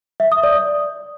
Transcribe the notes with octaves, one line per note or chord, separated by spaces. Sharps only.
E5
D#6
D5